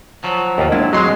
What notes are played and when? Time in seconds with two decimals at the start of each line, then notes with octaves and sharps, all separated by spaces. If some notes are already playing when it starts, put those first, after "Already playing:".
0.24 F3 F#3
0.58 D#2 F4
0.72 G#3 A#3 D4 E4 A5
0.93 D2 F#3 G#3 C4 F#4 D#5 C6